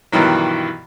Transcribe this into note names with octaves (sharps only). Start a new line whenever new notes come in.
G2 B2 D#3 E3 F#3